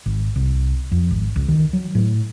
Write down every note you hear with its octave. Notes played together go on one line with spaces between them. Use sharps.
G#1
C2
F2
G#1
C#2
D#3
F#3
A2